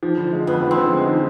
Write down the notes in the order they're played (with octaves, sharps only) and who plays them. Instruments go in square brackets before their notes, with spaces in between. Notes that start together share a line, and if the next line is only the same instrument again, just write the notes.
[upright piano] F3
D3
G#3
[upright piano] F2 [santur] B3
[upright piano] F3
[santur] C4
[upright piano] D3
G#3
F3